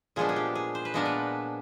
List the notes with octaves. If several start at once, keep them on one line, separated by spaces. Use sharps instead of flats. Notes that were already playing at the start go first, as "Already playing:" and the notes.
A#2 F3 G#3 B3 D4 G#4
G#4
G4
G#4
C5
B4
A#2 F3 G#3 B3 D4 A#4
B4